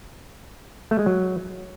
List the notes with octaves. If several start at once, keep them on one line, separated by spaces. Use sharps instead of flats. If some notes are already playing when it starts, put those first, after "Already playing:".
A3
G#3
F#3